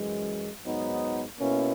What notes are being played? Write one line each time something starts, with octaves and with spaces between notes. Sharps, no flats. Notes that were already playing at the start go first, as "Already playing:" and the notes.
Already playing: F#2 E3 G#3
G#2 F#3 B3 D#4
B2 A#3 C#4 E4